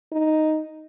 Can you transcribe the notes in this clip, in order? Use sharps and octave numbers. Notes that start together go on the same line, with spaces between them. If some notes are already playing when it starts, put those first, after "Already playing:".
D#4